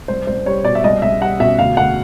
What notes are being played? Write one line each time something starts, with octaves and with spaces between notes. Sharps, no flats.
C2 C5
C2 C5
G3 C#5
B2 D5
E5
C2 D#5
C2 E5
G3 F#5
B2 E5
D2 F5
D2 F#5